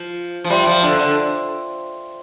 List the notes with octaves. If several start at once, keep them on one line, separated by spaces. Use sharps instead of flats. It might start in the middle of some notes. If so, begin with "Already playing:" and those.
Already playing: F3
F3
G3 F4 C5 E5 G5 C6
F3
D3
D3